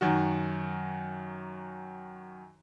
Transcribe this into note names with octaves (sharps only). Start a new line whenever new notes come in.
F#2 D#3 F#4